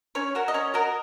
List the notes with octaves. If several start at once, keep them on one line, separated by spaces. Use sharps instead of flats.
C#4 C#5
F#4 A#4
D#5
C#4 C#5
F#4 A#4 D#5